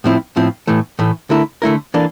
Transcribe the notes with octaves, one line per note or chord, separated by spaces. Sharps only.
A2 F3 C4 E4
A2 F3 C4 E4
A2 E3 A3
A2 E3 A3
D3 A3 E4 A#4
D3 A3 E4 A#4
E3 A#3 D4 A4